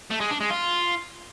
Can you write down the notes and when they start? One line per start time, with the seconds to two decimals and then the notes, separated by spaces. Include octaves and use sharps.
0.11 A3
0.21 G#3
0.30 D4
0.40 G#3
0.50 F4